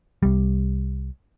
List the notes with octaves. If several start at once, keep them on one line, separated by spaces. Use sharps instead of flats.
C2 G3